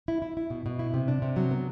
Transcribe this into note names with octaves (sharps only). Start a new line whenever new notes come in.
E4
E4
E4
B2
B2
E4
C3
D4
C3
F#3
B3